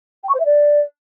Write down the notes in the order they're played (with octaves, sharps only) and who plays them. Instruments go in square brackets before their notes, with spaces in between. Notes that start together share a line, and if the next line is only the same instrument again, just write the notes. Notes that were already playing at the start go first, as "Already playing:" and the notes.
[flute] G5
C#6
C5
E5
D5